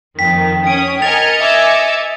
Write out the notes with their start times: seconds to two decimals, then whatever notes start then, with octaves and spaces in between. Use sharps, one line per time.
0.19 F2 D#3 G5 B6
0.67 C#4 D#6 D7
1.02 A#4 D#5 G#5 F6 G#6 A6 C#7 F7
1.39 E5 G#5 D6 E6